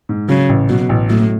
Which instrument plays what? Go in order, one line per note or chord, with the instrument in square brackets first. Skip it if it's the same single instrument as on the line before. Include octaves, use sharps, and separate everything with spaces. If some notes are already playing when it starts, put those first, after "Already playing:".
[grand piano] G#2
[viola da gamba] C#3 [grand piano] F#3
[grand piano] A1
[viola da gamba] B2 [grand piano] F#3
[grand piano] A1
[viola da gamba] A2 [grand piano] F#3